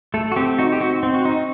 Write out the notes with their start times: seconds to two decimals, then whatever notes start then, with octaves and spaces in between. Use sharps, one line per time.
0.14 A3 A4
0.32 F#4
0.36 C4 G4
0.58 D#4 F#4
0.72 G4
0.80 C4 F#4
1.03 C4
1.14 F#4
1.25 D#4